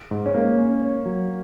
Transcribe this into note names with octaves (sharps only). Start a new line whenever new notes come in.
G#2
C#4
G#3 A#3
C#4
C#5
F#3